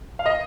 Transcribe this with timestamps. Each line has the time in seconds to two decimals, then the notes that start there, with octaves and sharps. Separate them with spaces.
0.19 F5
0.26 D#5